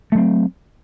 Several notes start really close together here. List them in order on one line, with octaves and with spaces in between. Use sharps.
A3 F#3 C4